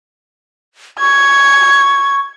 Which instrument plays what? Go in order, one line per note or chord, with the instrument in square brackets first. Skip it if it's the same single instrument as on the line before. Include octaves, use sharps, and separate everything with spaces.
[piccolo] C#6 [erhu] G#6